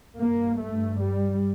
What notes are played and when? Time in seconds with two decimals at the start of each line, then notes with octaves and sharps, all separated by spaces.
0.19 G2 A#3
0.59 A3
1.01 G3